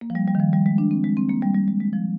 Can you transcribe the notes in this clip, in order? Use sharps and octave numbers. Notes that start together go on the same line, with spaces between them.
A#3
F3
G3
G3
D#3
F3
G3
G#3
D4
C4
G#3
C4
A#3
G3
G3
G#3
G#3
F3